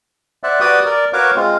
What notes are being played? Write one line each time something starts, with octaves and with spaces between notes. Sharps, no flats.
C5 D5 E5 F#5
F#4 G4 B4 D5 G5 D#6
A#4 D5
F#4 A#4 B4 C#5 F5 D6
G#3 C4 F4